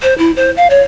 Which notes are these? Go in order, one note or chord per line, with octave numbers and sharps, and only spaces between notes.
C5
E4
C5
F5
C#5